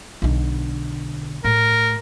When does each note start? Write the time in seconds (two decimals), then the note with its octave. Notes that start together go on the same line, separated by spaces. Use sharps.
0.22 B1 D3
1.44 A2 A#4